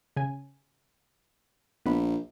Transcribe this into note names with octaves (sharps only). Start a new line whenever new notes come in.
C#3 G#5
A#1 B3 B5